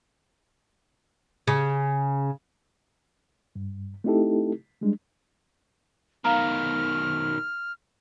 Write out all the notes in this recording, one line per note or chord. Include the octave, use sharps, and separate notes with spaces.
C#3
G2
A3 C4 D#4 E4 G4 A4
G3 G#3 D4
B2 D#3 F5 A#5 F6